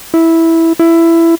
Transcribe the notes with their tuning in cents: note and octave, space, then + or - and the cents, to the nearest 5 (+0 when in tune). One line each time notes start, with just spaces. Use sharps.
E4 -5
E4 +15